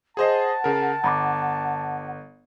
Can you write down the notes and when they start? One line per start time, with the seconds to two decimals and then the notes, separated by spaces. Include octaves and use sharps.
0.17 G#4 C5 D#5 F#5 A5
0.64 C#3 A#4
1.04 G1 A#5 B5 D6